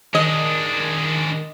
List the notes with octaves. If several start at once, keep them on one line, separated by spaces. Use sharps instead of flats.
D#3 G#3 D4 D#5